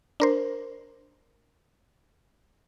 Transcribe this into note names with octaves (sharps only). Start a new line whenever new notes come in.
D4 A#4 C5